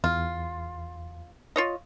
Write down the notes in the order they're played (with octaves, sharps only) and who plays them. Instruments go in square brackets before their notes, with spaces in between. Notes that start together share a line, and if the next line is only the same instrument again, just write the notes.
[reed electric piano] E2 [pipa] F4
[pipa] F4 C#5 D#5